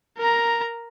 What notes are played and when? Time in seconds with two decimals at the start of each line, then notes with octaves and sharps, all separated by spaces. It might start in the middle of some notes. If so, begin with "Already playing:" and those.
0.17 A#4 A#5